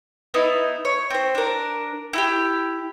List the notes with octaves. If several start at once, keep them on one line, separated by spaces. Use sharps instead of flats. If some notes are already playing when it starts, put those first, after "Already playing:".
B3 D#4 E4
C#5
C4 C5
D4 A#4
E4 F#4 G4